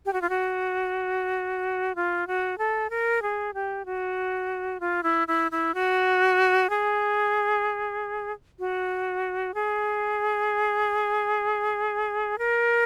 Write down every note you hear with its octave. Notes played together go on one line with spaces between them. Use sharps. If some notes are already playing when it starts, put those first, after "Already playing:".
G4
F#4
F4
F#4
F4
F#4
A4
A#4
G#4
G4
F#4
F4
E4
E4
E4
F#4
G#4
F#4
G#4
A#4